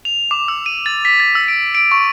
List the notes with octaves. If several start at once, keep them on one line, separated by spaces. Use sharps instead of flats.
F7
D6
E6
D#7
A6
B6
A6
E6
D7
D7
C#6